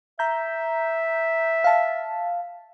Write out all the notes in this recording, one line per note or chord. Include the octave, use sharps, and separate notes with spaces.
E5 A#5 G6
F5 A5